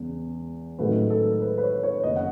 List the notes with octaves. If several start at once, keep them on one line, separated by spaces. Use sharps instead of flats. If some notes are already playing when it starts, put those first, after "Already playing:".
Already playing: E2 C#3 G#3
A1 G#2 D#3 F#3 A3 B4
A4
B4
B4
C#5
C#5
F#1 F#2 D#3 D#5
F#5